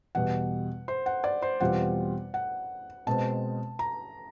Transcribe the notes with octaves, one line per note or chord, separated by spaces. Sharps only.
E2 B2 G3 F#5
C5
F#5
D5
C5
E2 B2 G3 C4 F4 F#5
F#5
B2 G#3 C4 A5
A#5